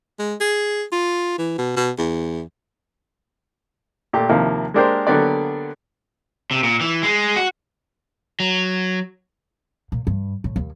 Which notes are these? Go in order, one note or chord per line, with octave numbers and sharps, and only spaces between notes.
G#3
G#4
F4
E3
B2
B2
E2
A#2 A3 G4
D#2 C3 F3 A#3 E4 F5
G#3 A#3 D4 G4 A#4 C5
D3 F#3 A#3 B3 G4 D5
C3
A#2
E3
G#3
F#4
F#3
A#2
G2
A2
D#2